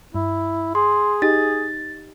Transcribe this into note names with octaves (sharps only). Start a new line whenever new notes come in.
G2 E4
G#4 C6
D#4 G4 D#5 A6